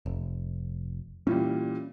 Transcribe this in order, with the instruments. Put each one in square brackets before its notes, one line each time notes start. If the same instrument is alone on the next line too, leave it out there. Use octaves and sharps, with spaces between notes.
[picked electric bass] F1
[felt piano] A#2 E3 G3 [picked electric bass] C#4